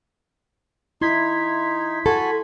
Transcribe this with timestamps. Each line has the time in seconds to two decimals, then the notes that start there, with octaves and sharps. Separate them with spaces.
1.01 D#4 E4 C6 G#6 B6
2.06 F#4 A4 G#5 B5